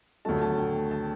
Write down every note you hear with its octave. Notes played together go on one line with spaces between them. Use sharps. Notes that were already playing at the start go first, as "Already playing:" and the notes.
D2 D3 F#3 A3 A5
A5
G5
A5